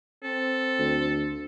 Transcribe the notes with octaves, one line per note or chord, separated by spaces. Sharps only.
C4 A4
D2